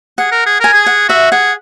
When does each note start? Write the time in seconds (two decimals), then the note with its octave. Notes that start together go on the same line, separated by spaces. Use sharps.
0.18 G#4 F#5
0.32 A#4
0.46 G#4
0.60 A#4 G#5
0.73 G#4
0.86 F#5
1.09 F#4 E5
1.32 G#4 F#5